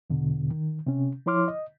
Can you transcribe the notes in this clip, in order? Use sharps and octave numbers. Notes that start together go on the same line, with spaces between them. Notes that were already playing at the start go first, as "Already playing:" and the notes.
E2 B2 D3
D#3
C3 C#4
F3 E4 C#5 C6 D6 F6
D#5